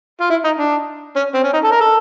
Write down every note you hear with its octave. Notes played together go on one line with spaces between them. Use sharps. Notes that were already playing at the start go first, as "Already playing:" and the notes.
F4
E4
D#4
D4
C#4
C4
C#4
D#4
A4
A#4
A4